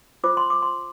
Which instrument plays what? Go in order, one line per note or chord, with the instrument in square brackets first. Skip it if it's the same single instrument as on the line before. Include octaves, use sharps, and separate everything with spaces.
[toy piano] F4 C5 D6
C6
D6
C6